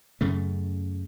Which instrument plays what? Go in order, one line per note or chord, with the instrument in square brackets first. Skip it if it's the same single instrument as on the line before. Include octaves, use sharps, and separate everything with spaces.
[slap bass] F#2 C#3 A3